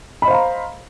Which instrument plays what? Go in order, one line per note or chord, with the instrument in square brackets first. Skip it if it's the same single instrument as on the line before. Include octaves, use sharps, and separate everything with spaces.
[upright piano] B5
D#5
C5
F5
A#5